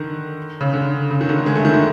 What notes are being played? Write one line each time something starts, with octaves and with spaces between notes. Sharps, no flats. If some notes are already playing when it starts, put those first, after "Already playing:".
Already playing: D3 D#3
C#3
D3
C#3
D#3
D3
G#3
A3
D#3
D3